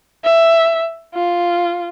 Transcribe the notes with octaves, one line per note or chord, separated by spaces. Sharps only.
E5
F4